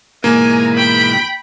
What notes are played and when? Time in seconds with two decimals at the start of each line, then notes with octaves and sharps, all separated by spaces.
0.24 G#2 B2 E3 A#3 G#5 A#5
0.73 G5 B5